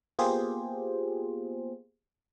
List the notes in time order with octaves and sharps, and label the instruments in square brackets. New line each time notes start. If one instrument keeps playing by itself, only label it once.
[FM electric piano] A#3 B3 F4 G4 G#4 C5